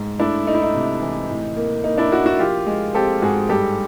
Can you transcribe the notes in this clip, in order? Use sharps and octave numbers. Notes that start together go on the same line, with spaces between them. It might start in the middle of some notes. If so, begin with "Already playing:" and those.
Already playing: G#2
A3 D4 E4
A3 D#4
E4
D#4
C3
E3
A2
A#3
A#3 D#4
D4 E4
A#3 E4 F#4
E4 F#4
F3 F4 G4
G#3
C4 G4 A4
G#2 F#4 G#4
G2 G4 A4